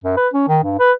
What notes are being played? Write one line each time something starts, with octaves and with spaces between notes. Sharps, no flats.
F#2
B4
C#4
D#3
G2
B4